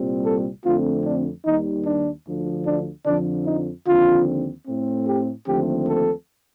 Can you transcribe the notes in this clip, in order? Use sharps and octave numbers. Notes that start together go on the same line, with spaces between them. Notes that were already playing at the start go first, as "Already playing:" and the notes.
Already playing: C2 A#2 G3 C4
A4
F2 D3 A3 C4 F4
D4
D#2 D#3 G3 D#4
D4
D2 D3 F3
D4
F2 D3 F3 D4
D#4
D#2 D3 F3 C4 F4
A2 A3 C4
G4
D#2 D3 F3 A3 C4 G4
A4